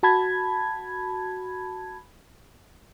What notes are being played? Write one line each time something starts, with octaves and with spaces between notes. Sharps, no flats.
F#4 A5 B5 G#6